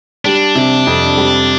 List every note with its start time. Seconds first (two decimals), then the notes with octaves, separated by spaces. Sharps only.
0.25 G3 D4
0.55 C3
0.87 F2
1.17 G3